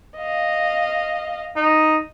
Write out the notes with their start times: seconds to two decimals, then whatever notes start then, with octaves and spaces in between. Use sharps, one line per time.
0.18 D#5 F5
1.56 D#4